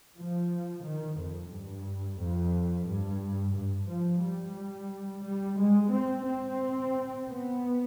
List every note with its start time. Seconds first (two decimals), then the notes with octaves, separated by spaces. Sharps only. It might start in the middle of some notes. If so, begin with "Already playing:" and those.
0.16 F3
0.84 D#3
1.17 F2
1.51 G2
2.19 F2
2.87 G2
3.55 G2
3.89 F3
4.23 G3
5.24 G3
5.59 G#3
5.92 C4
6.26 C4
7.28 B3